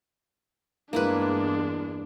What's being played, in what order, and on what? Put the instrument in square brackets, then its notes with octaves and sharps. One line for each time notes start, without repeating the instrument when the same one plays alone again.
[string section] E2 G2 G#3 [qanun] A#3 E4 B4 [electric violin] D4